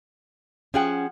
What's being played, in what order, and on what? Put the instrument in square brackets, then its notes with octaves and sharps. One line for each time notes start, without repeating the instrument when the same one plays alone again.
[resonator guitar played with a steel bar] F3 G#4 F#5 [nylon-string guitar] C#4 G5